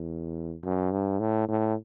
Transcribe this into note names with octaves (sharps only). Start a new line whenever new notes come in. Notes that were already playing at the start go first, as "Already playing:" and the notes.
Already playing: E2
F#2
G2
A2
A2